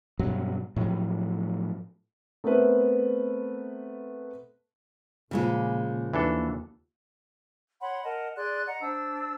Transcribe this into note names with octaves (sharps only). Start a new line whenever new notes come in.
G2 B2 F#3
A2 F3 F#3
A3 B3 C4 A#4 B4 E5
A#2 C#3 F3 G#3 A#3 B4
D#2 E3 D4 A4
C#5 F#5 B5 C6
A#4 D#5 F#5 A5
G#4 D5 C6 F#6
D#5 F#5 A#5
D4 C5 E6